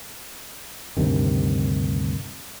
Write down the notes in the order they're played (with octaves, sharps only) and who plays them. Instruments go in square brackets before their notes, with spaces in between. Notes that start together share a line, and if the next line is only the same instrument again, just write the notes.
[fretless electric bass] D2 G2 C3 D#3